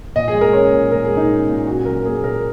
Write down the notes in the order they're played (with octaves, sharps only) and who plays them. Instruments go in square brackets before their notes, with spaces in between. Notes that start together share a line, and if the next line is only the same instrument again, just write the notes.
[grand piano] A#2 D#5
G#4
G#3
A#4
C#4 C#5
A#2
A#2 A#4
G#4
G#3
D#4
C#4
A#2
C#4 F#4
F#3 A#4
A#3 G#4
A#2 A#4